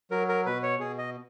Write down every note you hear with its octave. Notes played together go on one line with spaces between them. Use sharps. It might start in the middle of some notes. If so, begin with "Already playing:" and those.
F#3 A#4
A#4
B2 B4
C#5
B2 G#4
D#5